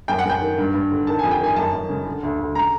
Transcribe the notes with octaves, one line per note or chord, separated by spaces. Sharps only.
F#2 G5
F#5
F#2 G5
D#3
G2
G2
D3
D#3 A5
F2 G#5
G5
D#3 G#5
F#2 A5
F#2
C#3
D3
D2
D2
C#3 A#5